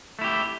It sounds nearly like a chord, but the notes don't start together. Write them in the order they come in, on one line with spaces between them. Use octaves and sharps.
A3 E4 G4